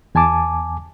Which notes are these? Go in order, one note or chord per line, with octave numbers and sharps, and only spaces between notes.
E2 G#5 A5 D6